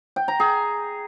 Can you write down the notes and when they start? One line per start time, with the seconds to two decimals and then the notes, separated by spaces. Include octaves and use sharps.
0.16 G5
0.28 A#5
0.40 G#4